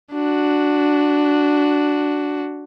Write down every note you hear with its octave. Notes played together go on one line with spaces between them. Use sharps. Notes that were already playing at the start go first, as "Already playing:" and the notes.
D4 F#4